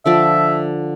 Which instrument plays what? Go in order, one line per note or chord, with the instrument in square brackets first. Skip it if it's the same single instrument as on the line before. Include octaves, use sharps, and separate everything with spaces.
[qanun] D3 F3 D5 [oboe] E5